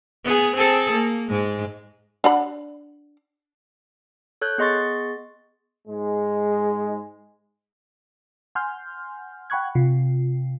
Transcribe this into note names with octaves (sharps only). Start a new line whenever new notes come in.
B3 G#4
C4 G#4 A4
A#3
G#2 G#3
D4 F#5 B5
A4 C#5 F#6 G6
B3 G#4 D#5 C6 C#6 A6
G#2 G#3
F#5 G#5 C6 F6 G6
F#5 G5 B5 C#6 F#6 G#6
C3 F4